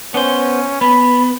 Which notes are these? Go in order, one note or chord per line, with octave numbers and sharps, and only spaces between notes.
B3 C#4 C5
B3 B5